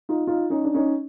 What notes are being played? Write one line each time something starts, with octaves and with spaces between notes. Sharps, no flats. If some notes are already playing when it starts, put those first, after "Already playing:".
D#4 F4
D#4 F4
C#4 D#4
D4
C#4 D#4